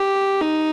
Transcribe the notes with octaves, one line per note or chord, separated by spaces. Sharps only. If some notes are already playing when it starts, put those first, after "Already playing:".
Already playing: G4
D#4